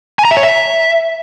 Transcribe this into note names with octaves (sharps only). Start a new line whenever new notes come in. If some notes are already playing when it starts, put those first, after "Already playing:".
G#5
A#5
E5
C#5
E5